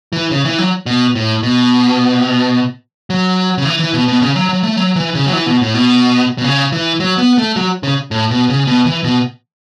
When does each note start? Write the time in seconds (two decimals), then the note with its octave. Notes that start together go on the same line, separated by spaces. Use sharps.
0.13 E3
0.31 C#3
0.45 E3
0.58 F#3
0.86 B2
1.15 A2
1.43 B2
3.10 F#3
3.58 C#3
3.65 E3
3.80 E3
3.94 B2
4.08 B2
4.22 C#3
4.36 F#3
4.49 F#3
4.63 A3
4.77 F#3
4.96 E3
5.15 C#3
5.26 F#3
5.33 E3
5.46 B2
5.61 A2
5.74 B2
6.38 B2
6.44 C#3
6.72 E3
7.00 F#3
7.18 B3
7.38 A3
7.56 F#3
7.83 C#3
8.11 A2
8.31 B2
8.49 C#3
8.67 B2
8.86 E3
9.04 B2